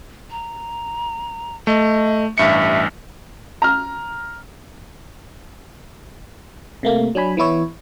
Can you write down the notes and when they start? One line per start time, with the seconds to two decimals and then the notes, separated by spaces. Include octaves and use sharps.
0.31 A#5
1.67 A3 D#5
2.38 A1 G2 E5 C#7
3.62 A#5 F6
6.83 C3 A3 A#3
7.15 F#3 D4 G#5 B5
7.37 E3 B3 E4 C#5